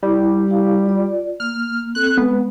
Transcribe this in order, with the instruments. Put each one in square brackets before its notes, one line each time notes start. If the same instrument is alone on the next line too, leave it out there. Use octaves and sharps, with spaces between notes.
[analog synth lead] G3 [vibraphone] E4
[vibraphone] E4 G4 F5
F4 D5
[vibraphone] A#3 [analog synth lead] F6
[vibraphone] C4 A4 [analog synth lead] F#6
[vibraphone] G#3 B4 [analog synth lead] B3